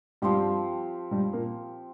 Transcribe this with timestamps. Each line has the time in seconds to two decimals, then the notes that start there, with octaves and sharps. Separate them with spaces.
0.22 G2 F3 G3 C4 G4
1.11 G2 G3
1.33 A#2 A#3